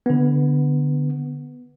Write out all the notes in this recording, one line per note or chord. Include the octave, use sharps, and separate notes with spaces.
D3 B3